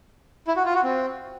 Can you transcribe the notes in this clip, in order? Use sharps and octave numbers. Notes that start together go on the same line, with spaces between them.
E4
F#4
F4
F#4
C4